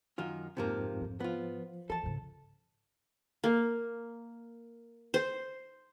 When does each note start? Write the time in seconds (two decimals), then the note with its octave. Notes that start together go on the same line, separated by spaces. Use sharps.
0.18 F#2 D#3 F4
0.57 F2 G#2 C3 F3 A#3 C4
1.01 F2 G#2
1.20 F3 B3 F4
1.90 E3 A4 A5
2.03 G#2 C#3
3.44 A#3
5.14 C5